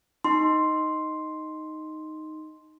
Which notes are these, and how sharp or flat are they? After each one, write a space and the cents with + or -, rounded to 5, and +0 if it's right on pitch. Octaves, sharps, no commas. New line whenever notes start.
D#4 +0 C6 +0